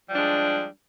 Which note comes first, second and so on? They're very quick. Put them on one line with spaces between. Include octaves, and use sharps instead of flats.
G3 F3 D4 G#3